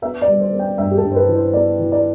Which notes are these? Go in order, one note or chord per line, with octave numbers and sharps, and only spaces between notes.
B3 E5
D5
G3
C5
B3
G5
G2 E5
G4
A4
G2
C5
B4
E3
C5
B3 D5
E3
D5